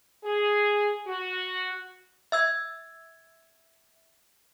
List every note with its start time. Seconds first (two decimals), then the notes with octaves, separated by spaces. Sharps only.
0.24 G#4
1.07 F#4
2.32 E5 E6 G#6